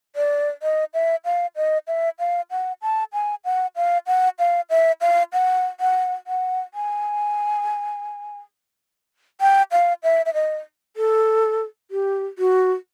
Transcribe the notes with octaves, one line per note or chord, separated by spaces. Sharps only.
D5
D#5
E5
F5
D#5
E5
F5
F#5
A5
G#5
F#5
F5
F#5
F5
E5
F5
F#5
F#5
F#5
G#5
G5
F5
E5
E5
D#5
A4
G4
F#4